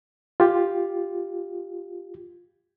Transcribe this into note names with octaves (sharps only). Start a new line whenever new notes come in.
F4 G4